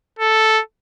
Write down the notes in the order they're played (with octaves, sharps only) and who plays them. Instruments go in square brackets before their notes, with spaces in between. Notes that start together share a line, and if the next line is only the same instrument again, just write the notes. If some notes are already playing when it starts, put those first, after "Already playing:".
[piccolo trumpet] A4